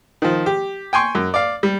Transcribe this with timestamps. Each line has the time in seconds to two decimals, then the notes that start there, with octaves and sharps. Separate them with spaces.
0.22 D#3 F3
0.46 G4
0.93 G5 G#5 C6 C#6
1.15 F#2
1.34 D5 F5
1.63 G3